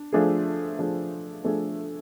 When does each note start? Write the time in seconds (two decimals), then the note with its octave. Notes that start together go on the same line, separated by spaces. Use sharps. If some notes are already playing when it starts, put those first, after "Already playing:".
Already playing: D4
0.13 F3 A3 D4 G#4
0.79 F3 A3 D4 G#4
1.44 F3 A3 D4 G#4